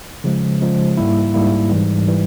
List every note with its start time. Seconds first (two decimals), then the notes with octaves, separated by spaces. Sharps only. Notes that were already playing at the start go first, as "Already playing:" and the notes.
0.24 C#3 F3 G#3
0.61 C#3 F3 G#3
0.97 G#2 G3 A#3 E4
1.34 G#2 G3 A#3 E4
1.71 G#2 E3 G3
2.08 E3 G3